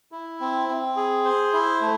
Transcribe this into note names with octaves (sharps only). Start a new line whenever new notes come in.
E4
C4
C4
G#4
C5
E4
A3